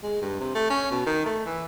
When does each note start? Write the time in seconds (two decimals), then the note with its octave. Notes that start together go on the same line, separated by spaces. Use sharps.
0.03 G#3
0.22 G2
0.40 C3
0.55 A3
0.70 C#4
0.91 B2
1.06 D#3
1.25 A3
1.46 E3